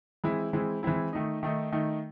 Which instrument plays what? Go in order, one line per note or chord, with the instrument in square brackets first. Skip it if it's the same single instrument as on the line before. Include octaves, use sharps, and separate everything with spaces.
[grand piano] E3 G#3 C4 E4
E3 G#3 C4 E4
E3 G#3 C4 E4
D#3 A3 D#4
D#3 A3 D#4
D#3 A3 D#4